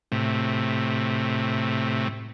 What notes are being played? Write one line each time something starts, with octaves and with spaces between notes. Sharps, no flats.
A2 C3